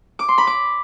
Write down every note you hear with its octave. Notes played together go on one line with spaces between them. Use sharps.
D6
C6
B5
D6